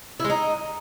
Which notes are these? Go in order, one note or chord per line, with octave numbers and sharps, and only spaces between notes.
E4
G#3
D#4